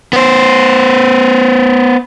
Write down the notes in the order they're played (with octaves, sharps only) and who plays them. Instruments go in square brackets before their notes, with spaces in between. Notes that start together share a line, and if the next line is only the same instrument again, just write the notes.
[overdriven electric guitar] B3 C5